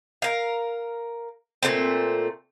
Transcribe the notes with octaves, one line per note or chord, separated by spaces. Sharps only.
A#4 F5
A#2 D#3 A3 C4